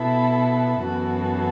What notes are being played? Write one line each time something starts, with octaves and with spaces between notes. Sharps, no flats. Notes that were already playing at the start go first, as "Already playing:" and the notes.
Already playing: B2 B3 E4 A4
F#2 E3 B3 F#4 A4